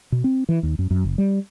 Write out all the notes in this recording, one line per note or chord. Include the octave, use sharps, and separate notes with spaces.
B2
C4
E3
D#2
F#2
F#2
F#1
G3